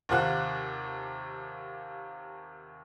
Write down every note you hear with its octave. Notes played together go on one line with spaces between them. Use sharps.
D#2 C3 F4 C5 F#5 F#6